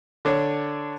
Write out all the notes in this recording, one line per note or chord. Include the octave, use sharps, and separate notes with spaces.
D3 D4 C#5